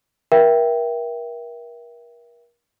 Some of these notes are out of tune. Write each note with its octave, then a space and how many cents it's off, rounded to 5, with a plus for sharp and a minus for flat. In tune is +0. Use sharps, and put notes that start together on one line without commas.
A#4 +35 E5 +15 G5 +0